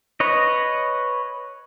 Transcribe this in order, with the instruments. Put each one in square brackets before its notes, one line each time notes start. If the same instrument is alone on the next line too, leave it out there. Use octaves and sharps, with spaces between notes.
[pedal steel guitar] B4 C#5 D#5